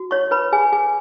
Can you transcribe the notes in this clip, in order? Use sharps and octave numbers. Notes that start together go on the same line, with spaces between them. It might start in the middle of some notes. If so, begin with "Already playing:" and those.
Already playing: F#4
C#5 C#6
B4 B5
G#4 G#5
G#4 G#5